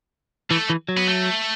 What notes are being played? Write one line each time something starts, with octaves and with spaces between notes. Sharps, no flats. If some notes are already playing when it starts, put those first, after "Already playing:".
E3 A3
E3
F#3
B3
A3